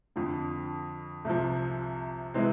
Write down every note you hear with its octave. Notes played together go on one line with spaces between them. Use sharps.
F2 D3 F3
C2 C3 F3
C3 E3 G#3 C4